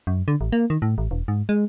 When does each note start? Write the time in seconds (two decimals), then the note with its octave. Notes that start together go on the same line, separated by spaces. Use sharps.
0.07 F#2
0.28 D3
0.41 A1
0.52 A#3
0.70 D#3
0.82 A2
0.98 A1
1.11 E1
1.28 G#2
1.49 G#3